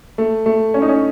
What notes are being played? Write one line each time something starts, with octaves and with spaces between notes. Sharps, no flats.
A3
A3
C#4
D#4
C#4